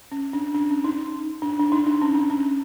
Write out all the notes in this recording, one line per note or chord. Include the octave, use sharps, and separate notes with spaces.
C#4
D4
D4
C#4
D#4
D4
D4
D#4
D4
C#4
D4
C#4